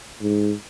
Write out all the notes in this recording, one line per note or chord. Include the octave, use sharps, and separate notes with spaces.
G#2